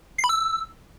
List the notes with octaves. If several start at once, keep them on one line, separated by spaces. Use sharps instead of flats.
C7
B5
E6